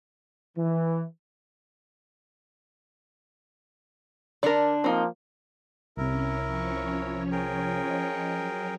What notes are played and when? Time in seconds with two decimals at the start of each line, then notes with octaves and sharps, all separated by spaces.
0.57 E3
4.43 D3 D4 A#4 D5
4.84 F3 A#3 C4 D#4
5.97 C2 C3 C#4 E4 A#4
6.45 F3 C#4 C#5
7.32 G#4 A#4 G5
7.90 D#5
8.37 F#3